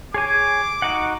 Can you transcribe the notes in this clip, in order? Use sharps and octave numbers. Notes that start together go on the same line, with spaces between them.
G#4 C#5 G#5 D6
D#4 F#4 F#5